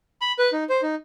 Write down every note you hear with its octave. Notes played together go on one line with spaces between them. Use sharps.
B5
B4
D#4
C5
D#4